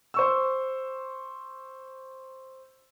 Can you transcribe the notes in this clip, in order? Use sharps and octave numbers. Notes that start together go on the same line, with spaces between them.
C5 C#6 E6